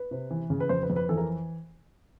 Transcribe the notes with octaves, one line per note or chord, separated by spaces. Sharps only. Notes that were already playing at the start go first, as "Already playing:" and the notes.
Already playing: B4
C3
E3
C#3
B4
F2 C5
B4
F2
B4
E3 A4
A#4